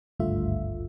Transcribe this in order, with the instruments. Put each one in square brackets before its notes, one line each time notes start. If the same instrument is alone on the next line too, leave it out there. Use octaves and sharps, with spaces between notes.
[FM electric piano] G#1 D2 G2 A3 F4 E5